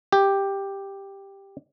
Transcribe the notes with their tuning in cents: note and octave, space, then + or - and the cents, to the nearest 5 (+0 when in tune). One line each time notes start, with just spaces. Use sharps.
G4 +5